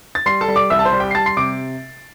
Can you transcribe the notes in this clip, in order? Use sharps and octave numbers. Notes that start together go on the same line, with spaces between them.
A6
G3 C6 C7
A4 A5
G3
D5 D6
C2 E5 E6
A5
C5 C6
G3
G4 G5
C7
G3 A5 A6
C6 C7
C3 D6 D7